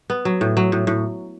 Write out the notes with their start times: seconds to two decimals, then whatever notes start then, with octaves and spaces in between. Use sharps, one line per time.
0.10 B3
0.25 F#3
0.41 A2
0.57 F#3
0.72 A2
0.87 A2